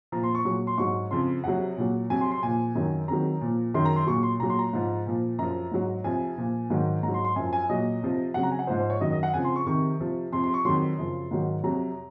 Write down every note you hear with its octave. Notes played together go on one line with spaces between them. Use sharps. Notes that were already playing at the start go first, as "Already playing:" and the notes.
A#2 F3 A#5
C6
C#6
A#2 F#3 C#6
C6
G#2 F#3 C#6
F2 C#3 F3 C6
F2 C3 F#3 F#5
A#2 F#3
F2 C3 F#3 G#5
C6
C6
A#2 F3 G#5
F#2 D#3 F#3
F2 D#3 F#3 A#5
A#2 F3
F#2 D#3 F#3 C6
A#5
C6
A#2 F#3 C#6
C6
A#2 F#3 A#5
C6
A#5
G#2 F3
A#2 F3
F#2 F3 A#5
G#2 F#3
F2 C3 F3 G#5
A#2 F3
G#2 D#3 F#3
G#2 F#3 A#5
C6
C6
F#2 F3 G#5
G#5
A#2 F#3 D#5
F2 C3 F3
F2 C#3 F#3 F#5
A#5
G#5
F#5
G#2 F3 C5
C5
C#5
F#2 D#3 F#3 D#5
D#5
F#5
F2 C#3 F3 G#5
C6
C#6
F2 C3 D#3 C#6
F2 C3 F3
F2 C3 F3 C6
C6
C#6
F2 D#3 F#3 C6
F#2 C#3 F3
G#2 D#3 F#3
F2 C3 F#3 A#5